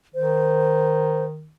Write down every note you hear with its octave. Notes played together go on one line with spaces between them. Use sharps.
D#3 C5